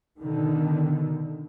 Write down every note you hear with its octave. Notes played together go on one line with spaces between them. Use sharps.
B2 D3 D#3